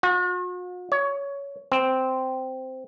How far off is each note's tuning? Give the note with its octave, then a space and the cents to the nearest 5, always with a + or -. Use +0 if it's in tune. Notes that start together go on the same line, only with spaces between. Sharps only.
F#4 -45
C#5 +15
C4 -5